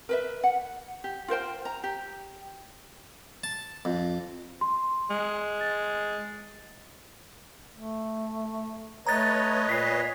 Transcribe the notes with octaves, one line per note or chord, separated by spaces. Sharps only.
A#4 B4 E5
F#5
G4
F4 A#4 C5 G5
A#5
G4
A5
F2
C6
G#3
A6
A3
A3 B4 C#5 D#5 A#5 A6
A#2 B6 C7